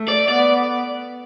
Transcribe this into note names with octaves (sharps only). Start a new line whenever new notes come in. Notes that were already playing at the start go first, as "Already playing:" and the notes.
Already playing: A3
D5
B3 D5